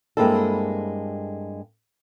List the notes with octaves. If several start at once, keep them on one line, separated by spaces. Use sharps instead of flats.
G2 G#3 A#3 C4 E4 A4